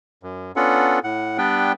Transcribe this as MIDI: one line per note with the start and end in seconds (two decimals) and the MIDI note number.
0.23 0.52 42
0.56 0.99 59
0.56 0.99 61
0.56 0.99 62
0.56 0.99 65
0.56 0.99 69
0.56 0.99 78
1.04 1.37 45
1.04 1.37 78
1.38 1.72 55
1.38 1.72 59
1.38 1.72 62
1.38 1.72 71
1.38 1.72 79